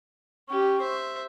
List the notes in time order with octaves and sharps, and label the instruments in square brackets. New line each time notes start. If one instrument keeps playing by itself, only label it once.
[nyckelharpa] C#4 G4 [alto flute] C#6
[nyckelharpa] C5 E5